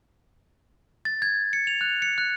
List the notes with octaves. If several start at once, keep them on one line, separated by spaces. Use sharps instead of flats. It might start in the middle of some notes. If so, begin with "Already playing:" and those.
A6
G#6
C#7
F7
F#6
C#7
F#6